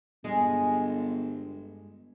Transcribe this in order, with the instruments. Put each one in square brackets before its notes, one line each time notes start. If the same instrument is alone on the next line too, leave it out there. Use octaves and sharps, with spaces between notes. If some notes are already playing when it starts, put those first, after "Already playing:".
[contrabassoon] G1 [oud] G2 G#3 G#4